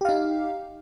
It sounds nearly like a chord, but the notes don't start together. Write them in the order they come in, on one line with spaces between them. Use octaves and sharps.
G4 F5 D#4